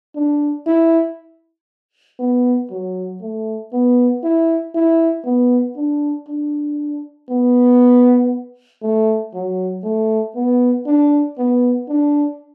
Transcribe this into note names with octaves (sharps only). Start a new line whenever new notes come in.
D4
E4
B3
F#3
A3
B3
E4
E4
B3
D4
D4
B3
A3
F#3
A3
B3
D4
B3
D4